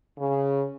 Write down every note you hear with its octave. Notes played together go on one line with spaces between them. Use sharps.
C#3